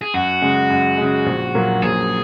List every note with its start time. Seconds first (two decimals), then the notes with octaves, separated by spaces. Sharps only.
0.01 G#4
0.14 F#2 F#4
0.42 C#3 G#3
0.70 F#2
0.98 C#3 G#3
1.26 A#1
1.55 A#2 F#3 A#3
1.82 A#1 G#4